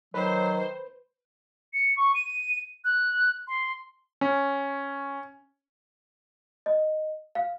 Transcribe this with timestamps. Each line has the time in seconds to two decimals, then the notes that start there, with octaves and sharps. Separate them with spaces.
0.14 D#3 F#3 B4 C5
1.73 C#7
1.97 C#6
2.15 D#7
2.84 F#6
3.48 C6
4.21 C#4
6.66 D#5
7.35 F5